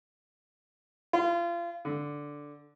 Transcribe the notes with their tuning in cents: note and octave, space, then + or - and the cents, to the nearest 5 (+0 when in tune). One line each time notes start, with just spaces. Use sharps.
F4 -30
D3 -5